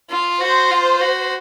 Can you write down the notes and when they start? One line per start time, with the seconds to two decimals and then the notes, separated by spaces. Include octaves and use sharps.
0.10 F4
0.40 F#4 C5
0.71 F4
1.01 F#4